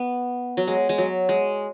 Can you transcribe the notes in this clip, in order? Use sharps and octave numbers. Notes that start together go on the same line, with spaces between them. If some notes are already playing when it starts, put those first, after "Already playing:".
Already playing: B3
F#3
G#3
G#3
F#3
G#3